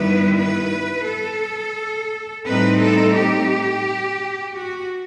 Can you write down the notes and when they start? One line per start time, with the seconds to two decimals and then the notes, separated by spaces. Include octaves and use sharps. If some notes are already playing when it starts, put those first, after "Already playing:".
Already playing: G2 D#3 G3 B3 E4 B4
0.38 B4
1.07 A4
2.46 A2 G3 C4 D#4 B4
2.80 A4
3.15 G4
4.54 F#4